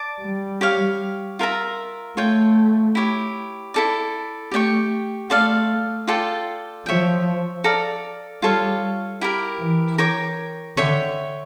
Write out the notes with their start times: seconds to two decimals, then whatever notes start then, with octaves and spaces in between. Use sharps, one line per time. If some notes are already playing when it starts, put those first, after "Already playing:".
Already playing: D5 A5 D6
0.22 G3
0.61 G4 C#5 F5
1.39 F4 A#4 E5 A#5
2.17 A3 F4 C#5 G5
2.95 E4 G4 C#5
3.74 E4 A4 D5
4.51 A3 G4 D5 G5 C#6
5.30 A3 F4 A4 D5 F5
6.07 F4 A4 D5 G5
6.86 F3 C#5 E5 G5
7.64 A4 D5 F5 A#5
8.42 G3 F4 A4 C#5 F5
9.21 E4 G4 A#4
9.59 E3
9.98 A#4 C#5 G5 D6
10.77 D3 C#5 E5 G5